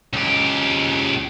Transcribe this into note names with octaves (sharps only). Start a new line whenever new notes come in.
C#2 G4